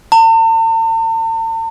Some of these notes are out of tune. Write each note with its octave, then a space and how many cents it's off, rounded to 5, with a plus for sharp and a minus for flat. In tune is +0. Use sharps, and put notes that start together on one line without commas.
A5 +45